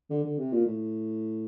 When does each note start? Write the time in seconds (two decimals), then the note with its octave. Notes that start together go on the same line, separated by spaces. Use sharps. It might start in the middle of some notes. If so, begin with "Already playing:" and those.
0.10 D3
0.24 D3
0.38 C3
0.53 A#2
0.66 A2